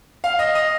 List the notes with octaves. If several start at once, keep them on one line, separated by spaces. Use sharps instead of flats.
F5
D#5
D#5